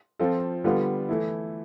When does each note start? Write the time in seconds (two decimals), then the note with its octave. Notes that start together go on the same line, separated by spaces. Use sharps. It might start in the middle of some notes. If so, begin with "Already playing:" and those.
0.19 F3 C4 F4 A4
0.64 D3 G3 B3 F4
1.09 E3 A3 E4